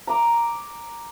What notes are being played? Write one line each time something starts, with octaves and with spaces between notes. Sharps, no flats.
A#5 D6